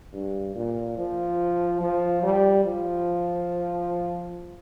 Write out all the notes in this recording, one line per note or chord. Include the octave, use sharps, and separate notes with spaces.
G2
A#2
F3
F3
G3
F3